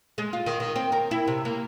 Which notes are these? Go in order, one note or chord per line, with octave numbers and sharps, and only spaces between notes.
G#3
F4
D#3
D#3
C4
A#4
E4
C3
A#3